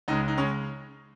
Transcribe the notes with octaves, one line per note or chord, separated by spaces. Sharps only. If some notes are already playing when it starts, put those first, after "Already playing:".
C#2 C#3 G#3 D#4
D#4
C#3 G#3 C#4